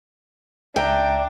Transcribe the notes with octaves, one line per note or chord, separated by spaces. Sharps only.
C#2 D4 E5 G5 A#5